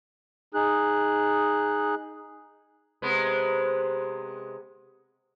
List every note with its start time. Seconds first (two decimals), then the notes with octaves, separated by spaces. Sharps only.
0.54 D#4 G#4 F#6
3.02 C3 G#3 B3